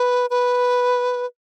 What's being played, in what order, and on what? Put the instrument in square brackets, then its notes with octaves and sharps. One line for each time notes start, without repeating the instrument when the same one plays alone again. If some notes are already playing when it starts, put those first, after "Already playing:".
Already playing: [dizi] B4
B4